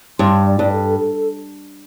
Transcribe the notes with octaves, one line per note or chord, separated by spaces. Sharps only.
G2 C6
D5
G2
A4
A4